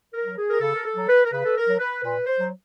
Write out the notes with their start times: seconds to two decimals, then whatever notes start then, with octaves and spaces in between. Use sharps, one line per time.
0.14 A#4
0.25 F#3
0.37 G#4
0.50 A#4
0.60 C#3 A4
0.74 A#4
0.85 A4
0.97 F#3
1.09 B4
1.24 A#4
1.32 C#3 B4
1.45 A4
1.56 A#4
1.68 F#3
1.79 B4
2.04 A#2 B4
2.27 C5
2.39 F#3